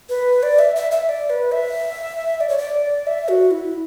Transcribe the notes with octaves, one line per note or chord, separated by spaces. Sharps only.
B4
D5
E5
E5
E5
D5
B4
E5
D5
C#5
D5
E5
F#4
E4